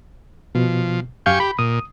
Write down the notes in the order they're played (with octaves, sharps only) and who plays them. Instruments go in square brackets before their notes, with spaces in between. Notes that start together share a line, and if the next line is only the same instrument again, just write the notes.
[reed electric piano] B2 [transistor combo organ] F3
[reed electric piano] F#2 F5 G6 [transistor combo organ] G4 G#5 C#6
[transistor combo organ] G4 [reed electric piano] B5
[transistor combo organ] A#2 [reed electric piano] D#6